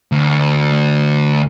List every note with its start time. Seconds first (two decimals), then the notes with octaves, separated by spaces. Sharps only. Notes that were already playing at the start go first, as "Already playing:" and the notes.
0.12 D2